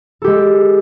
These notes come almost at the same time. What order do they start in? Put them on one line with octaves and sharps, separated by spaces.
A4 G4 G#3